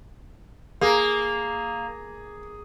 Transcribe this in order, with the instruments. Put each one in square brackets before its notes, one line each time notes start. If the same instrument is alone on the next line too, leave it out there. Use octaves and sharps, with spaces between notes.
[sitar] A#3 [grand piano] G#4